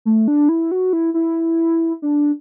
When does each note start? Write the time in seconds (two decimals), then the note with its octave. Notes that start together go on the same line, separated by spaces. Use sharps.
0.05 A3
0.28 D4
0.49 E4
0.71 F#4
0.93 E4
1.14 E4
2.02 D4